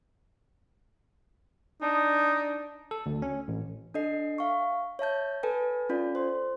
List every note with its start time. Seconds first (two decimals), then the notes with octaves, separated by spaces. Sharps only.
1.82 D4 D#4
2.91 A4
3.06 D2
3.22 C#4
3.48 A1
3.94 D4 A4 D#5 C7
4.38 E5 F5 C#6
4.99 C#5 E5 A5 G6
5.43 A4 B4 G#5 A5
5.89 C#4 F4 A4 D5
6.15 C5 C6